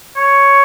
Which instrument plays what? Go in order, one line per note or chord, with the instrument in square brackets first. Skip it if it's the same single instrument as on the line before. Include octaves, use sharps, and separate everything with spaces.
[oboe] C#5